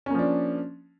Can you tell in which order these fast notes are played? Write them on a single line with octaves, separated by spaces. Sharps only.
C#4 A#3 F3 D4